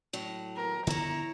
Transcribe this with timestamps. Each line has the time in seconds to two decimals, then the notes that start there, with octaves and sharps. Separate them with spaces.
0.13 A2 F#3
0.57 A#4
0.87 D3 E3 B3 E4 C#5 A#5